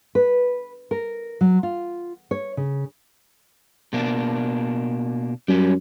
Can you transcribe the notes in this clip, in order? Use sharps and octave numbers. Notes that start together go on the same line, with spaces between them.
B4
A#4
F#3
F4
C#5
C#3
B2 A#3 D4
F#2 G3 C#4